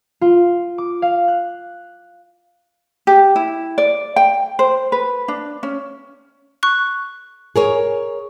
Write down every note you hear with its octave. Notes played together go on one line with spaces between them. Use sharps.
F4
D6
F5
F#6
G4
E4
D5
G5
C5
B4
D4
C#4
C#6 F#6
G#4 A#4 C#5